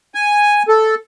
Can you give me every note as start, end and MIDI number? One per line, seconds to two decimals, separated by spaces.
0.15 0.63 80
0.68 0.95 69